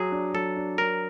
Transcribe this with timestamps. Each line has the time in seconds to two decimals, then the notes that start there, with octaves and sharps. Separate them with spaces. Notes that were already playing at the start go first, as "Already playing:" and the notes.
Already playing: F#3 G#4
0.12 D4
0.34 F#3 A4
0.57 D4
0.78 D4 A#4